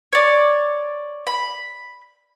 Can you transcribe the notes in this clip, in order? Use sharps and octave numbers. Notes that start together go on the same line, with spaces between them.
C#5 D5
B5